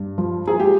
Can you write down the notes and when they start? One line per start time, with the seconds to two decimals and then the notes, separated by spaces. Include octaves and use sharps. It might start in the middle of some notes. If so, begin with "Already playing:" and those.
Already playing: G2
0.18 F3
0.47 G#4
0.60 G#3 G4